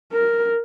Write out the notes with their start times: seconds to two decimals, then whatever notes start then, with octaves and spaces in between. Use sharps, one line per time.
0.13 A#4